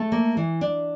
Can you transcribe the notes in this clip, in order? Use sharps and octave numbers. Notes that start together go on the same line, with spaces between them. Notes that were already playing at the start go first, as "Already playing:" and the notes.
Already playing: A3 A4
A#3
E3
D4